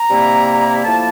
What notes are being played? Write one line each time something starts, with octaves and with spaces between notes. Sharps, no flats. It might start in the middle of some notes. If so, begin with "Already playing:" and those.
Already playing: A#5
C3 G3 A#3 E4
A2 F3 A#3 E4 A5